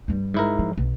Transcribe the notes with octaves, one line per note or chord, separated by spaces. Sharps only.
G2 G3
G#2 E4 A#4
F3
B1